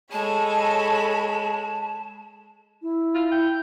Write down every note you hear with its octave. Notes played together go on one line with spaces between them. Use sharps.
G#3 A4 C#5 A5 B5
E4
F4
G5